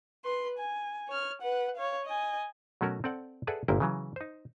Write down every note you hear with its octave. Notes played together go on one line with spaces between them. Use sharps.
B4 C6
G#5
C#5 F6
B4 F#5
C#5 F5
D#5 G#5
B2 F#3 A3 C#4 F#4 A#4
C4 A4 D5 F#5 G5
G#4 A4 B4 D5 E5 F#5
G1 A#2 A#3 E4 G5
C#3 E3 F#3
D#4 C5